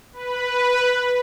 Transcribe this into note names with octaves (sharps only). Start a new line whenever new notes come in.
B4